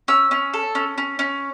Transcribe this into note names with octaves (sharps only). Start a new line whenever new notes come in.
C#4 E6
C#4
A4
C#4
C#4
C#4